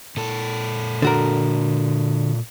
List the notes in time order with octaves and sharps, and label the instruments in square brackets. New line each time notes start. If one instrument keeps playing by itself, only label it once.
[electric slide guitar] A#2 A4
[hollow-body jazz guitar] D3 F#4 A#4